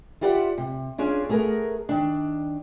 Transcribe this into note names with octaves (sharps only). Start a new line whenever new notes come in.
E4 F4 G4 D5 F#5
C3
C#4 D4 F4 G#4
A3 B3 G#4 A#4
D#3 D4